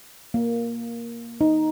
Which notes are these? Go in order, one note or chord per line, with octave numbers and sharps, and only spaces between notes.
A#3
D#4